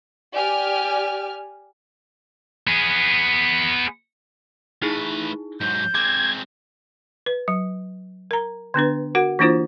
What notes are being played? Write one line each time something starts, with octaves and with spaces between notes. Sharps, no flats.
G4 D5 G#5 F6
B3 G#4
A3 D#4 E4 G#4 B4
G#2 F#3 G6
G#3 C4 D6 G#6
B4
F#3
A#4 A#5
D3 B3 D4 B4
F#4 A#4 F#5
E3 A#3 D4 E4 F4 C5